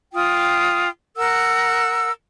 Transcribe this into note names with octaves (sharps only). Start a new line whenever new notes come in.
F4 G5 D#6
A#4 F#5 E6